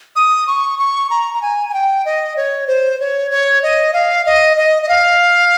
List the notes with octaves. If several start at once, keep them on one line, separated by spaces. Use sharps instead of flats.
D#6
C#6
C#6
A#5
A#5
G#5
G#5
G5
D#5
C#5
C5
C#5
C#5
D#5
F5
D#5
D#5
D#5
F5